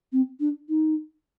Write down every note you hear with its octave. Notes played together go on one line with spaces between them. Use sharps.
C4
D4
D#4